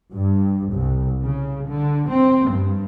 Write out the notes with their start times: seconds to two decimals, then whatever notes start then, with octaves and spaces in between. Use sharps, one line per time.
0.13 G2
0.74 C2
1.23 C#3
1.68 D3
2.10 C4
2.50 G2